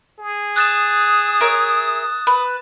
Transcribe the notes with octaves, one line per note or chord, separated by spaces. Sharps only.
G#4
D#6 F#6 A6 E7
A#4 C#5 E5
B4